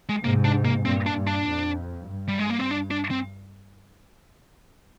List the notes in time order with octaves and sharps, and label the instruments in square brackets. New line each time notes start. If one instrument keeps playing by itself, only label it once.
[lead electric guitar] G#3
[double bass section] G#2 C3 [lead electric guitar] A#3
[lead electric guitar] D4
A#3
[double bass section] G2 A#2 [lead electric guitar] C4
[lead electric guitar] D4
[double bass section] G2
[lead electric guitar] D4
[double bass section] F2
G2
[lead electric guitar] G3
G#3
A#3
C4
D4
D4
C4